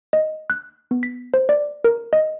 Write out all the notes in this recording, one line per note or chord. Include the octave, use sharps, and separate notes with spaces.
D#5
F#6
B3
B6
C5
D5
A#4
D#5